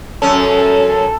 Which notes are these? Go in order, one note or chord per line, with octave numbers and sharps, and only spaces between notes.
F#2 C#4 A4